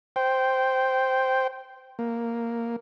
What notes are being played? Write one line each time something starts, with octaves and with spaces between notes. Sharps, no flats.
C5 G5
A#3